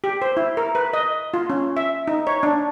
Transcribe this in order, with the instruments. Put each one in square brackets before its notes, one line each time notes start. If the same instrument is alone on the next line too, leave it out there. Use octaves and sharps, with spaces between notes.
[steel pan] G4
C5
E4
A#4
B4
D#5
F4
C#4
E5
D#4
C#5
D4